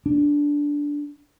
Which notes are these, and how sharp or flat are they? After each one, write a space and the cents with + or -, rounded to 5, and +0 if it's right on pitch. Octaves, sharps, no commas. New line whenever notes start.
D4 -10